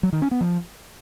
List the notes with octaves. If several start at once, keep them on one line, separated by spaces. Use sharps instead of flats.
F#3
D#3
C#4
B3
F3